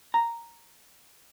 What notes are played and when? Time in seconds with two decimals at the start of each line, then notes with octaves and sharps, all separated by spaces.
0.14 A#5